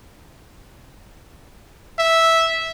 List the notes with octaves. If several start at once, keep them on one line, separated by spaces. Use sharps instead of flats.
E5